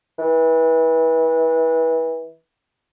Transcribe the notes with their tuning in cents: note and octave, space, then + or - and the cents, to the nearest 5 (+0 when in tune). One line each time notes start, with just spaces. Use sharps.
E3 -25